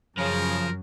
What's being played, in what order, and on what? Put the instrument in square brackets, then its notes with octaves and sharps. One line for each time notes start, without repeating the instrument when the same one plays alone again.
[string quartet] F#2 [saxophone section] C#3 [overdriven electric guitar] F3 [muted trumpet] A#4